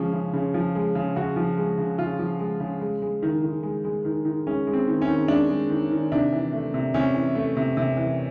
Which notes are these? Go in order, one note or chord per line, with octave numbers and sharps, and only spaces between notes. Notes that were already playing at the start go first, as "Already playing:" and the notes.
Already playing: C#3 F3 G#3 C#4
C#3
C#3
F3
G#3
C#3
C#3 F#4
F3
G#3
C#3
C#3 F4
F3
G#3
C#3
G#3
G#3
D#3
D#3
G#3
G#3
D#3
D#3
G#3 C#4
G#3
C4
D#3
C#4
D#3
G#3 D4
G#3
D#3
D#3
C3 D4
E3
A3
C3
C3 C#4
E3
A3
C3
C3
E3